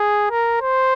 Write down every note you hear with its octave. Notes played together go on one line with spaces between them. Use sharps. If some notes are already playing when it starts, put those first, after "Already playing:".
Already playing: G#4
A#4
C5